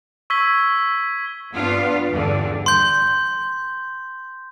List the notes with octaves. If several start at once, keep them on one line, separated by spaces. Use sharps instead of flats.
C#6 E6 G#6 B6 G7
G2 B3 D4 F4 F5
E2 G2 D3
C6 G6